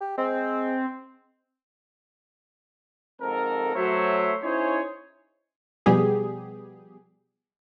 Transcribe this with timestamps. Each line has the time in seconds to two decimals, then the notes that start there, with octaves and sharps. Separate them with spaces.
0.01 G4
0.18 G#3 C4
3.22 F2 G#2 C4 A4 A#4
3.76 F#3 A3 F#4 C5 C#5 E5
4.43 C#4 D#4 E4 G#4 C5 C#5
5.86 B2 F3 G3 B3 G4 G#4